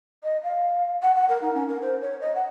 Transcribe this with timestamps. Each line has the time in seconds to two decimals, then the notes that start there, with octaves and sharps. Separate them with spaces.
0.23 D#5
0.43 F5
1.02 F#5
1.16 F#5
1.29 A#4
1.42 D#4
1.55 C#4
1.68 A#4
1.82 C5
2.01 C#5
2.21 D#5
2.35 F#5